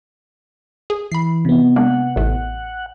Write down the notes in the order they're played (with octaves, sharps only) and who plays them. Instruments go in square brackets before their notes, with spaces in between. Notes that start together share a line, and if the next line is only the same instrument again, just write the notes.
[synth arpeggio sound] G#4
[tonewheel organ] E3 [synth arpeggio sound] B5 C7
[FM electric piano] C3 B3
[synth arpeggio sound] G#3 A#3 D4 [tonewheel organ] F#5
[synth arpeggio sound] A1 A2 A3